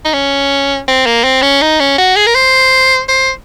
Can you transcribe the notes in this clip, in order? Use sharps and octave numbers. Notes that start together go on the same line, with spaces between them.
D#4
C#4
C4
A#3
C4
C#4
D#4
C#4
F#4
G#4
A#4
C5
C5